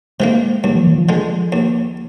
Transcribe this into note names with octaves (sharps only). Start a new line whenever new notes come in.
C3 D#3 G#3 A#3
D#2 G3
F3
D#3
F3
D3 G#3
D#2